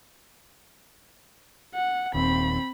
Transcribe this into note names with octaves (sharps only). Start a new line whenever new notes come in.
F#5
D#1 D#2 C4 B5